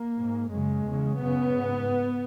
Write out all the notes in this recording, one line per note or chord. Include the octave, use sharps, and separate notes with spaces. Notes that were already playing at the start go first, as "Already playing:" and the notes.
Already playing: A#3
G#2
F#2 C#3 G#3
E2 C#3
F#2 C#3 B3
G#2